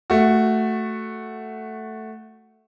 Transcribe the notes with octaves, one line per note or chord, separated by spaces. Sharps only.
A3 F#4